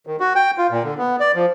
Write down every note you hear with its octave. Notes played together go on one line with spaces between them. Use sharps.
D#3
F#4
G5
F4
A#2
D3
B3
D5
F3